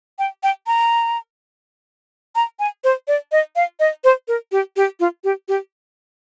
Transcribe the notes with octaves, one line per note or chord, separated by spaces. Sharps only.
G5
G5
A#5
A#5
G#5
C5
D5
D#5
F5
D#5
C5
A#4
G4
G4
F4
G4
G4